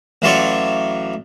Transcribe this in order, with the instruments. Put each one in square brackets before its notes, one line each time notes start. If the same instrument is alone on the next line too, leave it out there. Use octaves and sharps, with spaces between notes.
[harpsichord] A1 E3 F#3 F4 D5 C#6